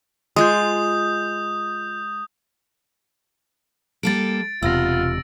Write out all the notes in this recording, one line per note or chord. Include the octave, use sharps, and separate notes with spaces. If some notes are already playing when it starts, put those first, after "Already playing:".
G#3 F4 D#6 G6
G3 A#3 A4 A6 D7
E1 C3 B3 F4 E6 A#6